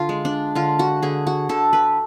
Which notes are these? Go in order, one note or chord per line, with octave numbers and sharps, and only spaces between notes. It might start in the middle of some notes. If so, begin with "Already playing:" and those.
Already playing: D3 F4
G#3
D4
D3 F4
F#4
D3 G#4
F#4
D3 A4
B4